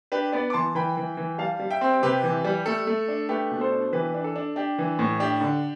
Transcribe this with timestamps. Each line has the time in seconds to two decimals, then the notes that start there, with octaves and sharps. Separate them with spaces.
0.12 D4 G4 B4
0.32 B3 B4 D5
0.50 D6
0.53 E3 A5 C6
0.75 E3 G5 B5
0.97 E3
1.17 E3
1.38 G3 F5 A5
1.60 G3
1.70 E5 G5
1.81 C4
2.03 C3 G4 B4
2.23 E3
2.44 G3
2.66 A3 A4
2.87 A3
3.08 D4
3.29 A3 G4 B4
3.51 B2
3.61 A4 C5
3.72 D4
3.92 E3 G4 B4
4.14 D4
4.24 A4
4.36 D4
4.56 D4 G4
4.78 E3
4.99 A2
5.20 D4 G4
5.41 D3